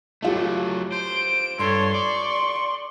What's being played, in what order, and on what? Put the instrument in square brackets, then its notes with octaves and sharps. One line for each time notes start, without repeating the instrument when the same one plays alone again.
[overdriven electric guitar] F#3 A3 [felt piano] E4 F4 G4
[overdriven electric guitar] C5 [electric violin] D7
[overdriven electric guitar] G2 [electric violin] A4 C#5 [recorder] C6
[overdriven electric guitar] D5 [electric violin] C#6